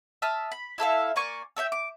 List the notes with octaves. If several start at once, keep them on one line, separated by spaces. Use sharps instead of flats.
E5 A5 D#6 F6
B5
E4 A4 E5 F5
A#3 D5 G#5 C#6
A4 C#5 E5 G5
D6